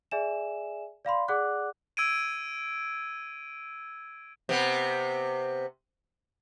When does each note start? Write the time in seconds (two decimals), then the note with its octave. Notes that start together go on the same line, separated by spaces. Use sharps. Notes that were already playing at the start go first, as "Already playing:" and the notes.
0.11 G#4 D5 E5 G#5 E7
1.05 D5 F5 B5 C6
1.28 G#4 D5 F#5 D6 F#6
1.97 E6 G#6 D7 D#7
4.49 C3 B3